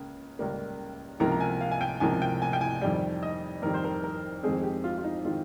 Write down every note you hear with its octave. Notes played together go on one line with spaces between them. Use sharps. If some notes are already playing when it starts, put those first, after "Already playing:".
Already playing: C#2 C#3 A#3
C#2 C#3 G3 A#3
C#2 C3 F3 A#3 A#5
A#5
G#5
F5
G#5
G5
C#2 C3 F3 A#3 G#5
G5
G#5
G5
G#5
F2 D#3 G3 G5
D#5
F2 D#3 G3 A#4
C5
A#4
A#4
F2 D#3 G#3 C4 G#4
G4
F4
F4
D#4
D#3 G#3 C4 F4